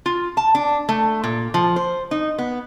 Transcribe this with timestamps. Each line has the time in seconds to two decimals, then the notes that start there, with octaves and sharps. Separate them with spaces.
0.06 F4
0.37 A5
0.55 D4
0.89 A3
1.24 A#2
1.54 F3
1.76 C5
2.11 D#4
2.38 B3